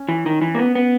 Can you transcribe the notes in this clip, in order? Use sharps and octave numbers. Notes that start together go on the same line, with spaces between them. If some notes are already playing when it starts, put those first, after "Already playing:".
Already playing: C#4
E3
D#3
E3
A#3
B3
B3